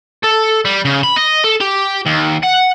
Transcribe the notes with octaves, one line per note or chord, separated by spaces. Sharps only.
A4
G3
C#3
B5
D#5
A4
G4
D#2
F#5